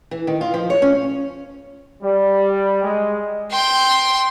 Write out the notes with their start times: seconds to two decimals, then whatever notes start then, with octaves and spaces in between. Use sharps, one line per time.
0.11 E3
0.27 D#3
0.41 F4
0.54 F3
0.70 C#5
0.82 C#4
2.02 G3
2.83 G#3
3.52 G5 C6